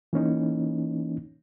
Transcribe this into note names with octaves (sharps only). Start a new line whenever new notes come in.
E3 A#3 C#4 D#4